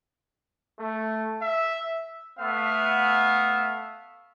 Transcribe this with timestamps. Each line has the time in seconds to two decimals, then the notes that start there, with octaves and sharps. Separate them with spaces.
0.80 A3
1.42 E5
2.40 A3 B3 E5 F5